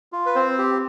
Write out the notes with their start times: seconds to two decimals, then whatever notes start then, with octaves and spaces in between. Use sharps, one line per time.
0.13 F4
0.26 B4
0.35 C4 C5
0.58 G4